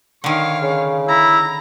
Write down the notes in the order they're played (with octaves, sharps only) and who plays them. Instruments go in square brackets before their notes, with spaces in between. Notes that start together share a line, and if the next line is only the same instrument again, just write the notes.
[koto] D3 D#3 [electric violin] C#5 F5
[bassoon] C#3
[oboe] E4 [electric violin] A#5